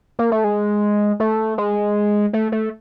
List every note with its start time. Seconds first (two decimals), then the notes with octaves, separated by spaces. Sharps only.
0.19 A#3
0.32 A3
0.44 G#3
1.20 A3
1.58 G#3
2.33 A3
2.52 A3